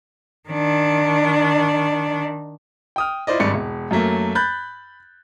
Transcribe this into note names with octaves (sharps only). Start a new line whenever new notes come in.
D#3 D4
G5 D#6 F6
E4 F4 C5 D5 D#5
G#1 G2 D5 C#7
E1
F#2 F#3 A3 A#3
B5 F#6 G6 A6